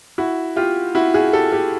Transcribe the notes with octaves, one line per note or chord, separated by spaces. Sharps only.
E4 F#4
F4 G4
E4 F#4
F#4 G#4
G4 A4
G4 A4